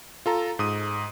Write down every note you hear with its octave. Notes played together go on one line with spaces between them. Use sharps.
F4 A4 A#5
G#2 D#6 D#7